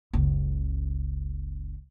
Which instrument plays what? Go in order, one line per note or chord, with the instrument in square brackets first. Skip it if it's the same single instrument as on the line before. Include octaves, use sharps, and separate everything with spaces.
[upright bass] F#1 C#2